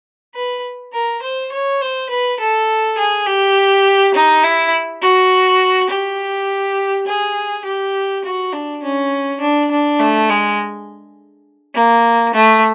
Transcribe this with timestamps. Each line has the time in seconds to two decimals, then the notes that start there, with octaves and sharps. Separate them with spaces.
0.34 B4
0.93 A#4
1.22 C5
1.52 C#5
1.81 C5
2.09 B4
2.40 A4
2.98 G#4
3.27 G4
4.14 D#4
4.44 E4
5.02 F#4
5.90 G4
7.07 G#4
7.65 G4
8.25 F#4
8.53 D4
8.83 C#4
9.40 D4
9.71 D4
10.00 A3
10.29 G#3
11.74 A#3
12.34 A3